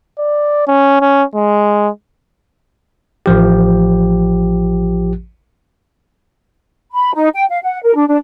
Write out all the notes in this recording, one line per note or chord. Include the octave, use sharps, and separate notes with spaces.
D5
C#4
C#4
G#3
A1 F3 G4
B5
D#4
G5
F5
F#5
A#4
D4
D4